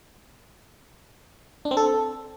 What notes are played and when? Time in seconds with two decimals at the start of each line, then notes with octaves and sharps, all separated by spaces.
1.65 D4
1.71 C4
1.77 A4